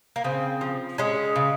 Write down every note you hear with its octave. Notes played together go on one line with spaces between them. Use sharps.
A#3
C#3 C4
F3
G#3 C#4
C#3